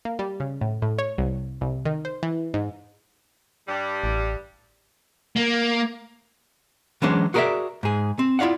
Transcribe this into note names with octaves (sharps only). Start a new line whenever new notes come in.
A#3
G3
C#3
A2
A2
C#5
C2
C2
D#3
C5
E3
G#2
G2 G3
A1
A#3
E3 F#3 G#3 C#4 D4 C5
F#4 G#4 A#4 C#5 D5 E5
G#2 G#4
C4
E4 F4 D5 F5 F#5